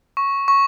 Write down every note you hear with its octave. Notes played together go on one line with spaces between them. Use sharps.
C#6
C#6